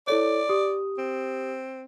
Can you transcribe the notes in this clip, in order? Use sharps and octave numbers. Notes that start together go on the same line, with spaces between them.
E4 A4 C#5 D5
G4 D#6
C4